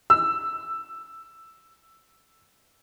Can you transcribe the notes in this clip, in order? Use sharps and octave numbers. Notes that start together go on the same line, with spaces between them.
E6